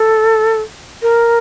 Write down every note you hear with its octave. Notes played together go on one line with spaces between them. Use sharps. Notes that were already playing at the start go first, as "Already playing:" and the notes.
Already playing: A4
A#4